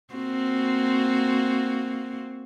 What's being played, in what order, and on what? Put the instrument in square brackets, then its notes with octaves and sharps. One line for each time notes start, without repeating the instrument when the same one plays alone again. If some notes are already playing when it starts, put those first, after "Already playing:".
[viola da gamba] A#3 C4 F#4